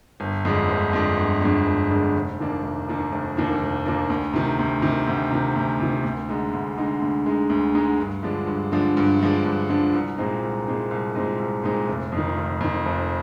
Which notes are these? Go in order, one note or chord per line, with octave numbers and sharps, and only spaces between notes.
G1
F2 D3 G#3 D4
G1
F2 D3 G#3 D4
G1
F2 D3 G#3 D4
G1
F2 D3 G#3 D4
F1
D#2 D#3 A#3 D4
F1
D#2 D#3 A#3 D4
F1
D#2 D#3 A#3 D4
F1
D#2 D#3 A#3 D4
D2
C3 D#3
D2
C3 D#3
D2
C3 D#3
D2
C3 D#3
D2
D3 G#3 D#4
D2
D3 G#3 D#4
D2
D3 G#3 D#4
D2
D3 G#3 D#4
G2
D3 F3 G#3 D4
G2
D3 F3 G#3 D4
G2
D3 F3 G#3 D4
G2
D3 F3 G#3 D4
C2
A#2 G#3 C4 D#4
C2
A#2 G#3 C4 D#4
C2
A#2 G#3 C4 D#4
C2
A#2 G#3 C4 D#4
F1
F2
D#3
F1
F2 D#3
F1